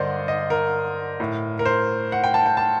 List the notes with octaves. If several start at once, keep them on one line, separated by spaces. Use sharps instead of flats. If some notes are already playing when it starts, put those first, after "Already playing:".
Already playing: G2 D3 A#4 C5 D5 D#5 F#5
D#5
A#4
A2
A#4
C5
F#5
G5
A5
G5
A5